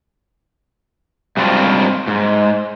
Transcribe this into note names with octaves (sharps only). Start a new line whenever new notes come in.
G#2 F#3 G3 C4 D4 F4
G#2